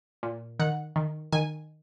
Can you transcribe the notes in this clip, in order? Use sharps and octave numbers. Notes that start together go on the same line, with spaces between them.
A#2
D#3 F#5
D#3
D#3 G#5